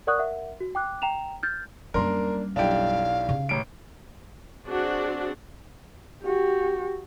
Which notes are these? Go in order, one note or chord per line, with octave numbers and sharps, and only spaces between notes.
A#4 D5 F#5 C#6 D#6 F#6
A#4 E5 F#5
F#4
G5 D6 F#6
G5 A#5 E7 F7
F6 G6 A6
F#2 G3 A#3 D4 A#4 C6
B1 D4 E4 G4 F5 D7
C#3
A1 D7
C4 D4 F#4 G#4 F#5
F#4 G4